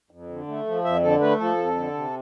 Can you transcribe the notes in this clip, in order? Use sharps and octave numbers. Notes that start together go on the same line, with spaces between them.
F2
D3
A3
F3
F2 E5
D3 A4
A3 B4
F3 A4
F2
D3
C3